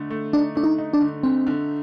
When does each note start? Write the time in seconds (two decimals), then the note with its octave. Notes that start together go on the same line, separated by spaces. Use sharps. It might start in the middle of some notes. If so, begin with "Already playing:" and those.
Already playing: D3 A3 D#4
0.10 A3
0.33 D4 D#4
0.55 A3 D4
0.64 D#4
0.78 D#4
0.93 D4
1.01 D3
1.23 D3 C4
1.47 D3